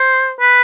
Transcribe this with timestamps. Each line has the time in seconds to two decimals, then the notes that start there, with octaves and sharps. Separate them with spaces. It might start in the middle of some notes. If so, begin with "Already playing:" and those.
Already playing: C5
0.40 B4